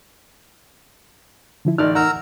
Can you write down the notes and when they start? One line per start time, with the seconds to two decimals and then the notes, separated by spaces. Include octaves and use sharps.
1.65 D3 F3 E4
1.78 A1 D#4 D5 F6
1.95 A#4 F#5 A#5 E6